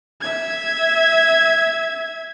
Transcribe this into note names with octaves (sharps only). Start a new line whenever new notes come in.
E5 G#6